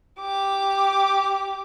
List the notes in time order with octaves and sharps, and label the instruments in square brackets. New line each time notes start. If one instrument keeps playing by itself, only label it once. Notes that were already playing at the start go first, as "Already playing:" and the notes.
[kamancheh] G4 D6